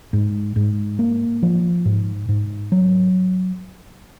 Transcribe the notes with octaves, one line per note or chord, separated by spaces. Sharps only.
G#2
G#2
A#3
F3
G#2
G#2
F#3